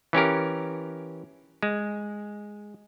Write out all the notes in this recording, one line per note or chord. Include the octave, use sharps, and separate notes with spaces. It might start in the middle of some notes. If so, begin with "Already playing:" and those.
E3 C#4 G4 A#4
G#3